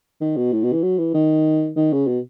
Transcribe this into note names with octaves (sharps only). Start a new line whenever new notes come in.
D#3
B2
A2
B2
E3
F#3
E3
D#3
D#3
C#3
B2